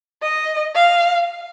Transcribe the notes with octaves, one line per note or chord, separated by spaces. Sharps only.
D#5
F5